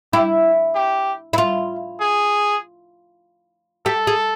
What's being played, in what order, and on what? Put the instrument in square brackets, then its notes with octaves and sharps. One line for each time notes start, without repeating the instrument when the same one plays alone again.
[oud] E4 [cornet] G4
[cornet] G4
[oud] E4
F4
[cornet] G#4
[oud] G4 [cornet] A4
[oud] G#4